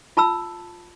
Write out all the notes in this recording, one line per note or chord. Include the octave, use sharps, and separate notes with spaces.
F4 A5 B5 E6